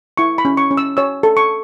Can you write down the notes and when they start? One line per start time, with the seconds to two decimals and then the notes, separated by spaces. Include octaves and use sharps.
0.17 E4 C#6
0.38 B5
0.45 C#4
0.57 C#6
0.71 C#4
0.77 E6
0.97 C#5 E6
1.23 A4
1.37 C#6